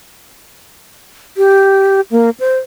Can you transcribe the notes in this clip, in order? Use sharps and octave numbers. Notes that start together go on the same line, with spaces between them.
G4
A#3
C5